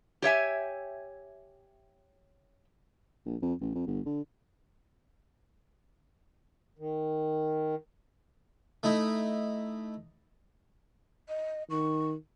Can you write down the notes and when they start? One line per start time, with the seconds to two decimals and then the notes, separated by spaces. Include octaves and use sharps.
0.22 G4 C#5 E5 G#5
3.26 A#1
3.42 F2
3.61 A1
3.75 F2
3.87 G1
4.06 D3
6.79 D#3
8.83 A3 D#4 E4
11.29 D#5
11.70 D#3 C#6